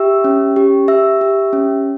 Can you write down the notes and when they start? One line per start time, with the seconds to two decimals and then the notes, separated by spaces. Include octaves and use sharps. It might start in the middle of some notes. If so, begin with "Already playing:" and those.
Already playing: G4 E5 E6
0.24 C#4
0.56 G4
0.88 G4 E5 E6
1.21 G4
1.53 C#4